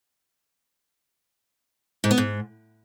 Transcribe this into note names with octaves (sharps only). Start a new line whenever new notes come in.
G#2
B3
G#2